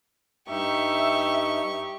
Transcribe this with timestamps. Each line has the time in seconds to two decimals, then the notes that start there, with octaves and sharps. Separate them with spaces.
0.49 G2 D#4 G4 E5 C#6